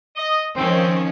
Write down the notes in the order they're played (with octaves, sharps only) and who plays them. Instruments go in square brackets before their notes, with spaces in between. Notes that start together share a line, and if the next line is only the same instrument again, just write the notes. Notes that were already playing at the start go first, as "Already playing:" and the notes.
[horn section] D#5
[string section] D#3 F3 C#4 [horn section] C4